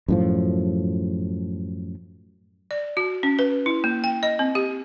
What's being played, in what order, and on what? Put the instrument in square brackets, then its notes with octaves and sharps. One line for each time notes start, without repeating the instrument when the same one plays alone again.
[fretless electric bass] F#2 A2 F3
[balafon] D5
F#4
C#4
B4
E4
A#3
G5
D#5
C4
G4